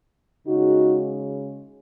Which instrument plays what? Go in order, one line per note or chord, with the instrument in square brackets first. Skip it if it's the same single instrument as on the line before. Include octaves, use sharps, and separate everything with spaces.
[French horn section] C#3 G#3 D#4 F#4